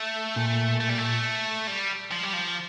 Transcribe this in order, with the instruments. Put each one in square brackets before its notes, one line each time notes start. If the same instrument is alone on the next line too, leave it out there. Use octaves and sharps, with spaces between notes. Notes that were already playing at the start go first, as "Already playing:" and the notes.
Already playing: [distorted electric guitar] A3
[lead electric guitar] A#2
[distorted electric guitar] A3
G3
A3
G3
F3
G3
F3